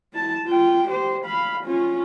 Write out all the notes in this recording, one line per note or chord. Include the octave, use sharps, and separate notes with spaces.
E4 A5
F4 G5
G4 C5
F5 B5
C#4 F4